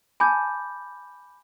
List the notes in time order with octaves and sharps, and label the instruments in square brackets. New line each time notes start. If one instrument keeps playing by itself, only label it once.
[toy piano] G#5 A5 [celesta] B5 D6 G6